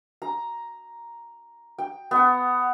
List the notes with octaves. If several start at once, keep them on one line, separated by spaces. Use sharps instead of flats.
A#5
G5
B3 F#5